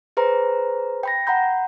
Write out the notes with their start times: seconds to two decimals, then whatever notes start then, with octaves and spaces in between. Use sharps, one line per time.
0.17 G#4 B4 C5 A#5
1.03 G5 B5 A#6
1.27 F#5 A#5 B5 G6